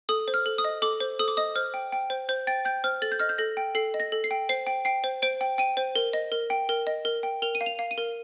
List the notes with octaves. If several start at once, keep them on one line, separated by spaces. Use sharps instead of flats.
A4 D#6
C5
F6
A4
D#6
D#5
A4 D6
C5
A4 D#6
D6
D#5 D#6
C5 F6
G5
G5
C5
C5 G6
G5 A6
G5 G6
C5 F6
A4 A6
G6
D#5 F6
G6
A4 A#6
G5
A4 C7
D#5
A#6
A4
C7
G5
C5 C7
G5
G5 C7
C5
C5 D7
G5
G5 D#7
C5
A#4
D#5
A#4
G5
A#4
D#5
A#4
G5
A#4 F7
D#7
F5
F7
F5
D#7
A#4